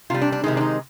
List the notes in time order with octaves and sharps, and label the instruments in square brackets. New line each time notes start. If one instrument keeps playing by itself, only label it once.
[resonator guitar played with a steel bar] C3 G3 F4
D4
D4
C3 D#3 G#3 D#4
D4
D#4